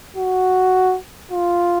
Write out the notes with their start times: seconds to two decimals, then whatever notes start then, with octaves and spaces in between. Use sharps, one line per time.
0.17 F#4
1.32 F4